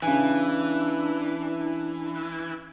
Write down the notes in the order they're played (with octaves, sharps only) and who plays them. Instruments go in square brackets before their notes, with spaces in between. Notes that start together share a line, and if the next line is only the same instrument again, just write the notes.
[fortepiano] C#3 G#5 [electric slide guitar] E3 [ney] D4